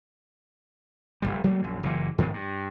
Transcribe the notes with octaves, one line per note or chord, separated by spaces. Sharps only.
F1 D#2 G3
F#3 G3 A3 A#3
A#1 F#2
F#1 A#2 E3
G#2 D#3 F3 B3
G2